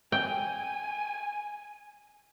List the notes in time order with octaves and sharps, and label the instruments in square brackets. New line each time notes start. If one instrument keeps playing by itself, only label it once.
[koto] G5 [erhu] G#5